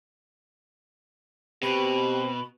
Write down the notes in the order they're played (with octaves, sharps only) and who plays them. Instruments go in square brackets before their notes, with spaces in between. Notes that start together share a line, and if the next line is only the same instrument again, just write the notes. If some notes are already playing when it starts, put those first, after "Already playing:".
[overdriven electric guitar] B2 [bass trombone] C4 [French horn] G4 [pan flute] B5